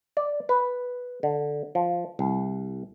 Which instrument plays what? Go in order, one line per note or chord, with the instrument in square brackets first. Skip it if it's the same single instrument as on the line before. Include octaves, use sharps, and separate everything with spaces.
[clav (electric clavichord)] D5
B4
D3
F3
C2